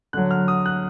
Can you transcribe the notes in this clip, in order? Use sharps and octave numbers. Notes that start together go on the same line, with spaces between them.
D3 F#3 F#6
F6
D#6
F#6